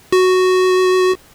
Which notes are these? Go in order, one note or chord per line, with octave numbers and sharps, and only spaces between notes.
F#4